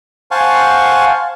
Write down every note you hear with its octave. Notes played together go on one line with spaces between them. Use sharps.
C5 F5 F#5 G#5 A5 C#6